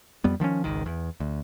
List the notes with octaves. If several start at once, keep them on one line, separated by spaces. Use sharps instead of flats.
F2 G3 B3
D#3 F3 C4 C#4
G#1 C#2 D#3
E2
D2